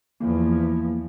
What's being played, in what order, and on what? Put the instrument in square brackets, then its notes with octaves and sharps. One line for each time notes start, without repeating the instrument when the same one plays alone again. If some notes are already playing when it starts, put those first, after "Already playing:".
[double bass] E2 F3 [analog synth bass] A#3